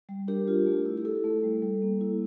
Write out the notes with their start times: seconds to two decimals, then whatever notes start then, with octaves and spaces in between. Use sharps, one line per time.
0.09 G3
0.28 D4 G4 A#4
0.48 F4
0.66 A3
0.85 E4
0.97 G4
1.05 E4 A4
1.24 A3
1.43 G3
1.62 G3
1.82 A#3
2.01 E4